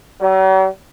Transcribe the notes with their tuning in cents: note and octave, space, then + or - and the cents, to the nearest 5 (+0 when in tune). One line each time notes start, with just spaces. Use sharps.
F#3 +45